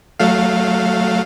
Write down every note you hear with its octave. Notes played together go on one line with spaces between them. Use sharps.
F#3 A3 F5